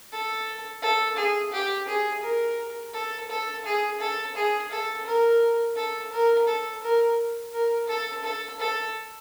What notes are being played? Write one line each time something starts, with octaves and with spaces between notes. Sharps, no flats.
A4
A4
G#4
G4
G#4
A#4
A4
A4
G#4
A4
G#4
A4
A#4
A4
A#4
A4
A#4
A#4
A4
A4
A4